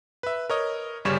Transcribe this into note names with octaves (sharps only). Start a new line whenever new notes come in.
B4 E5
A#4 C#5 D#5
G1 C#3 G3 C#4 C#5 E7